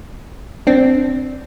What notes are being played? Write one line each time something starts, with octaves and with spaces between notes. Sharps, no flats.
C4 D4